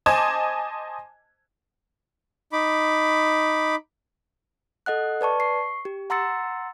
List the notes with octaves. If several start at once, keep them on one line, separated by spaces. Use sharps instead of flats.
C5 D#5 G#5 A5 D6 G#6
D#4 B5 D6
A4 D#5 F#5 F#6
B4 D5 A5 C#6
C#6 C7
G4
F#5 A#5 C6 E6 A6 C#7